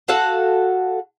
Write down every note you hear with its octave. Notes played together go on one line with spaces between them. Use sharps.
F#4 A4 F5 F#5